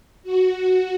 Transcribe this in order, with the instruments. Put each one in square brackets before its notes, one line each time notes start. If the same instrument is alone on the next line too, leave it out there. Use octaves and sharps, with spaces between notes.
[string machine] F#4